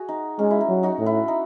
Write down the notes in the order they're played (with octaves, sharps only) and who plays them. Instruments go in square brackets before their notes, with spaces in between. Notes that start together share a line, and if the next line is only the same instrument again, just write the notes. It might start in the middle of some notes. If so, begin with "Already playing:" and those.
Already playing: [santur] F#4 G#4
D#4
[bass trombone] G#3 [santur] C#4
[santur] E4
D#4
[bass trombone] F#3
[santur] D#4 F#4
[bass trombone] A2
[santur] E4
D#4